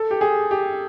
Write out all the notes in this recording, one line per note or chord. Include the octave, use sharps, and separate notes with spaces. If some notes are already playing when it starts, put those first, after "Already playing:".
Already playing: A4
G4
G#4
G4